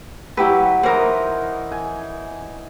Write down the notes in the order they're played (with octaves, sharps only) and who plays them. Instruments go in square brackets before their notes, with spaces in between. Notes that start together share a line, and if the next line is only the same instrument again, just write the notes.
[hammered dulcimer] F#3 [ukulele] E4 G4 B4
[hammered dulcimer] E3 D#4 [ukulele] A#4 C5
[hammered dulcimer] G#5